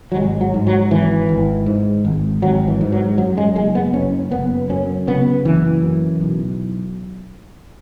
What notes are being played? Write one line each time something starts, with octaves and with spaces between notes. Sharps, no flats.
F#3
G#1 G#3
F#3
G#2
F#3
G#1 E3
G#1
G#2
G#1
G#1 F#3
E3
G#2
F#3
F#2 F#3
G#3
F#1 G#3
B3
F#1 C#4
F#1 B3
F#2 C#4
C#3 B3
F#1 E3
F#2
B1